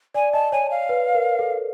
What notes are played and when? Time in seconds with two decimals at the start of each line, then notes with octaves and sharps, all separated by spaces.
0.14 D5 G#5
0.33 D#5 A5
0.52 C#5 G#5
0.71 F5
0.89 B4
1.14 A#4
1.39 A4